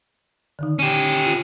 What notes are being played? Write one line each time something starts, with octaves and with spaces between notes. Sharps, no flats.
D3 D#3 D#4
C#4 G4
F4